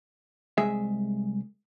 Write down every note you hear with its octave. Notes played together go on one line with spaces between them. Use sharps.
C2 G#3 G#4 E5